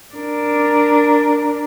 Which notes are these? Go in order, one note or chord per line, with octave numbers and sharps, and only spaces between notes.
D4 A#4